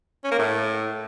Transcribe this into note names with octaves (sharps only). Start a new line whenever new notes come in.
C#4
A#3
A2